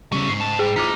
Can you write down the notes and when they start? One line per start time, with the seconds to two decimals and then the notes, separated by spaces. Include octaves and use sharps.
0.12 C#3 G3 C#4 A4
0.29 G#2 C7
0.41 A2 A5
0.59 G3 G#4
0.76 D#2 F3 D#4 D6 F6 B6